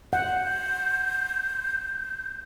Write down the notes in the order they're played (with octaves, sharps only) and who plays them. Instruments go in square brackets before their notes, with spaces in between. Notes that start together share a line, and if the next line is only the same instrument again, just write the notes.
[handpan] F#5 [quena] G6